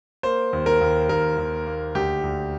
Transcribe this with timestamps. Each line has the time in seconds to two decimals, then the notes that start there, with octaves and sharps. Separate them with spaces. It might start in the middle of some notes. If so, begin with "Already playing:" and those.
0.23 A#3 C5
0.53 D#2
0.66 A#4
0.81 D#2
1.09 D#2 A#4
1.38 D#2
1.67 A#3
1.95 D2 G4
2.23 D2